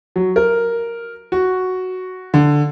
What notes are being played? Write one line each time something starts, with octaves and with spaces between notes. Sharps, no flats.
F#3
A#4
F#4
D3